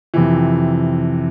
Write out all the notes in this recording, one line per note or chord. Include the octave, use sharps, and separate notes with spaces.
F2 C3 E3